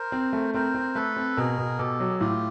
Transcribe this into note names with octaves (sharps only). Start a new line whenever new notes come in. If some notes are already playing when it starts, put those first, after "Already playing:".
Already playing: A#4 C5
C4
A3
C4 A#4 C5
C4
A3 A4 B4
C4
B2 G#4 A#4
B2
B2 G4 A4
F#3
G#4
A2 F4 G4